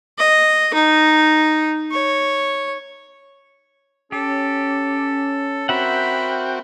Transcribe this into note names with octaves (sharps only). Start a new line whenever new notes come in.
D#5
D#4
C#5
C#4 G4 A4
C4 F#4 A#4 E5 F#5 G5 B5